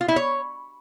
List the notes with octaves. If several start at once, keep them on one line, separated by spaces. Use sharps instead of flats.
F4
E4
C#5